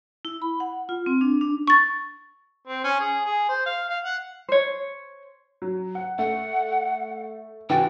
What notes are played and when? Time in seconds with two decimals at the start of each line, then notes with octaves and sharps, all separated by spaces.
0.25 E4
0.42 B5
0.60 F#5
0.89 F4
1.06 C4
1.21 D4
1.41 D4
1.67 C#6 A6
2.68 C4
2.84 C#4
3.00 G#4
3.26 G#4
3.49 C5
3.66 F5
3.89 F5
4.05 F#5
4.48 C5 C#5
5.62 F#3
5.95 F#5
6.19 A3 F#5
7.70 E3 F#4 G5 A6